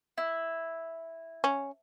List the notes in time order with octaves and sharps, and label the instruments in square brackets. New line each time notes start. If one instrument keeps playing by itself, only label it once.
[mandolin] E4
[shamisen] C#4